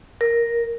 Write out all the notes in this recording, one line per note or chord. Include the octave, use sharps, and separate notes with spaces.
A#4